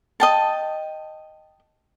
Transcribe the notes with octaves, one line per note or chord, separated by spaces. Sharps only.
D#5 G5 A5